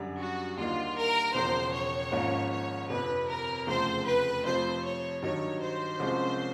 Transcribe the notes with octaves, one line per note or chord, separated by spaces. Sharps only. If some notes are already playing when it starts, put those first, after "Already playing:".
Already playing: F#2 D3 G3
F#4
D#2 D3 G3 A#3 D#4 F4
A#4
E1 E2 C#3 F3 C5
C#5
G#1 G#2 F3 A#3 C#4
C#5
G1 F2 C3 B4
A#4
F1 E2 C#3 F3 A3 C5
B4
F2 C3 F3 A3 C4 C5
C#5
G2 D#3 F#3 C#5
C5
C2 C3 F3 G#3 C#4